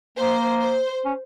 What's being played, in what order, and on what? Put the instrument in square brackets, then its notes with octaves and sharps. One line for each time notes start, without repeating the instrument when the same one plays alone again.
[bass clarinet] A#3 [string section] C5
[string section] C5
[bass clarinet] C#4